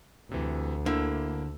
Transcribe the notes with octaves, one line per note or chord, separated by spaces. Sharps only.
D2 C3 E3
D3 A#3 E4 E6